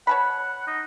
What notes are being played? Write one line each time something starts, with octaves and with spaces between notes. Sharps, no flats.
C#5 F#5 A5 B5
D#4